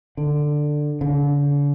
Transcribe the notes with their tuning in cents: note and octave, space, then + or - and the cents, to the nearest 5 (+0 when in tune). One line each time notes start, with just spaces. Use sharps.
D3 +10
D3 -40